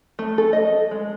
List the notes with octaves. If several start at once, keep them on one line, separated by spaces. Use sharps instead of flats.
A3
A4
D#5
G#3